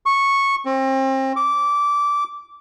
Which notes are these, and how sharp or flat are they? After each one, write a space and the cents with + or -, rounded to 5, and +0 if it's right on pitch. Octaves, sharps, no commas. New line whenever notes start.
C#6 -10
C4 +30
D6 -15